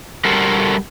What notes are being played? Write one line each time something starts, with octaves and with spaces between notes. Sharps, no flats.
D3 G3 F#4 A4 A#4 C5